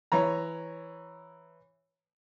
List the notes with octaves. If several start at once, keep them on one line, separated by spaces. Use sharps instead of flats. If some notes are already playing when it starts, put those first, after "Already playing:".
E3 C#5 A#5